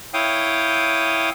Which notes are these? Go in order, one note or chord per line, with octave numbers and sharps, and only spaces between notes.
E4 C#5 F5 G5 D#6